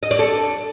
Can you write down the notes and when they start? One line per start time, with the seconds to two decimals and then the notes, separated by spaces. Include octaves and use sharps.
0.03 D#5
0.11 D5
0.19 A4